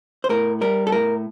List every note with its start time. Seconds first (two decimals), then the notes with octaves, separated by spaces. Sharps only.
0.24 C5
0.29 A2 A#4
0.61 G3 A#4
0.87 A4
0.92 A2 A#4